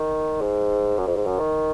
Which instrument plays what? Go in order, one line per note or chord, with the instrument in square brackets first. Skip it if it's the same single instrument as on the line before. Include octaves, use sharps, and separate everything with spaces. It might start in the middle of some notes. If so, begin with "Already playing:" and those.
Already playing: [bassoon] D#3
G#2
F#2
F2
G#2
F#2
D#3